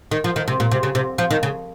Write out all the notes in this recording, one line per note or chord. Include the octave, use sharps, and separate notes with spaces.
D#3
F3
D#3
C3
A#2
C3
C#3
C3
F3
D#3
C#3